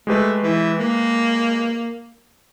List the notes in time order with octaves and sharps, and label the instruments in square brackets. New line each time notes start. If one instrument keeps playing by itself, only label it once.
[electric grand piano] G#3 G4 B4 [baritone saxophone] A3
[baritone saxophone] E3
A#3